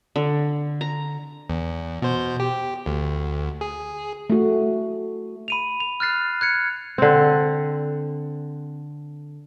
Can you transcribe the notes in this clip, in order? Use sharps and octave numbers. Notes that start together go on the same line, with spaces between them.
D3
A#5
E2
B2 C5 G6
G4
D2
G#4
A3 F#4
B5 D#7 F7
F7
F6 F#6 A6 C7
F#6 G#6 C#7
D3 C4